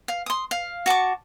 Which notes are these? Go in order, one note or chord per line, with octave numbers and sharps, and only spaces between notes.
F5
C6 D#6
F5
F#4 A5 C#6 D6